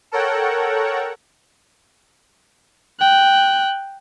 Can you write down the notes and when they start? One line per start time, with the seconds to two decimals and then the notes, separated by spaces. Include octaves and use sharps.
0.12 A4 A#4 C#5 F#5 G5
3.00 G5 F#6